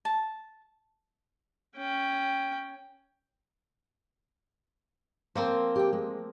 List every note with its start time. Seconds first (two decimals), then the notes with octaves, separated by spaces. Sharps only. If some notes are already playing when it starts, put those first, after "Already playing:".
0.05 A5
1.76 C#4 G5
5.35 F3 A#3 C4 C5
5.76 G4 G5
5.93 G#3